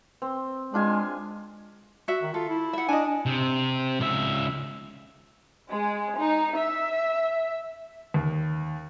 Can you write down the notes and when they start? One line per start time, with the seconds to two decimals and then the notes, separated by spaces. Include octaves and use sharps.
0.22 C4
0.74 G#3 D4 F4 G#5
2.08 F#4 E5
2.22 D#3
2.34 F4 A4
2.49 E4
2.73 E5 F#5
2.88 D4 D#5 G#5
3.26 C3
4.00 C#2 E5
5.71 G#3
6.18 D#4
6.56 E5
8.14 D#2